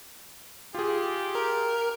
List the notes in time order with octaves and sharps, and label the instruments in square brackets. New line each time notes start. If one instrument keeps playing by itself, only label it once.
[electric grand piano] F4 G#4 [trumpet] G4
[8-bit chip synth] A#4